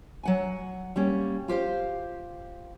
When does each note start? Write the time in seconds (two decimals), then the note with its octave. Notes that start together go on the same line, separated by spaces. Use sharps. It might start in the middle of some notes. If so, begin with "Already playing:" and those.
0.23 F#3 F#5 G#5
0.96 G3 A#3 C#4
1.48 F4 G4 C5 F5